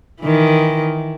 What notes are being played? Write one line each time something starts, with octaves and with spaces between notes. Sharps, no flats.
D#3 E3